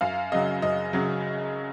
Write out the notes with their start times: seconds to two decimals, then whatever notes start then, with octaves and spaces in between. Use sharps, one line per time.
0.01 F#2 F5
0.32 C#3 F#3 D#5
0.62 F#2 D#5
0.93 C#3 F#3